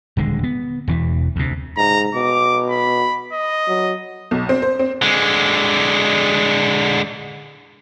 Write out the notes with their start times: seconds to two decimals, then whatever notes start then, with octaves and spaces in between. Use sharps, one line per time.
0.17 D#1 D3 G#3
0.43 B3
0.88 E1 E2 E3
1.36 D2 C3
1.77 G#2 A#5
2.15 B2 D6
2.70 B5
3.33 D#5
3.68 F#3
4.31 B1
4.49 C4
4.62 C5
4.79 C4
5.02 D3 G#3